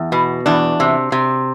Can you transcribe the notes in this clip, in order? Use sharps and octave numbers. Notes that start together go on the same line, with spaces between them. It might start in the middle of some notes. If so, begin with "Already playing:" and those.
Already playing: E2
B2
E2 D4
C3
C3